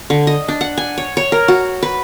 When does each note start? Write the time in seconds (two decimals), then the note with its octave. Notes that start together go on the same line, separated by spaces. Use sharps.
0.10 D3
0.27 D#5
0.48 D4
0.61 F#5
0.78 G#5
0.98 C#5
1.17 C#5
1.32 A#4
1.48 F#4
1.83 B4